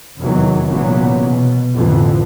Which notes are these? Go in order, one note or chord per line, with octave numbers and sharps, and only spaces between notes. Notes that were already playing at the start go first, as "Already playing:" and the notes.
F1 E2 D#3 E3 F#3
F1 A#2 C#3 E3 F#3 B3
B2
A1 F2 D3 E3 F3